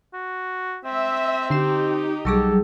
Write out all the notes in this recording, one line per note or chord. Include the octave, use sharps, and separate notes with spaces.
F#4
C4 E5
D3 D#4 G4 C7 E7
B1 F#3 G3 G#4 A4 C#6 D6